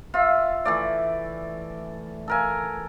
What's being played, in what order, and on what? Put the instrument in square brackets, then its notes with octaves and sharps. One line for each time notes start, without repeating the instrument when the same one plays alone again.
[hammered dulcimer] F4 E5
E3 A3 D5
A4 A#4 G#5